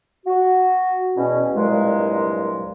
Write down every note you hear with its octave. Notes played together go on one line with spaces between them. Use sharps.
F#4
E2 B2 C#4
C2 G2 A#2 F#3 G#3